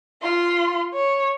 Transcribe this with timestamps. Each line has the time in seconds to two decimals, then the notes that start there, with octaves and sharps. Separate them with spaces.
0.22 F4 C6
0.94 C#5